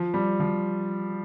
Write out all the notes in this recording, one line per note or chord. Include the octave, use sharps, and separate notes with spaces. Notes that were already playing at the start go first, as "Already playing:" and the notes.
Already playing: F3
G3
F3